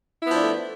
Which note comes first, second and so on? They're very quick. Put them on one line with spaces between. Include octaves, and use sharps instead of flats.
E4 B3 F3 D4 A3